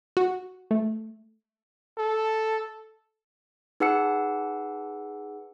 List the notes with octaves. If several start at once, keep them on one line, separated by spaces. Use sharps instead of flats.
F#4
A3
A4
D#4 G#4 B4 F#5 E6 C#7